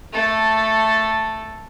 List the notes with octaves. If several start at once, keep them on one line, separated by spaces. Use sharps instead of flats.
A3 A4